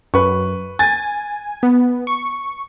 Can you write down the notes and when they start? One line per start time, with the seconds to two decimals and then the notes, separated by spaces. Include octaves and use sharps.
0.14 F#2 B4 C#6
0.79 G#5 A6
1.63 B3
2.07 C#6